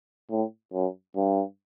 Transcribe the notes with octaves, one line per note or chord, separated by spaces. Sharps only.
A2
F#2
G2